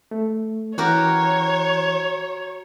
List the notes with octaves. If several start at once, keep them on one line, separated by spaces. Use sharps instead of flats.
A3
E3 F#4 G4 A#4 C#5